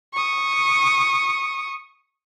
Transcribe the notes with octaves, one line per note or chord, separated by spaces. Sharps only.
C#6 D#6